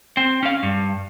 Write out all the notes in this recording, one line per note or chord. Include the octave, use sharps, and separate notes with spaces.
C4
C#4 F5
G2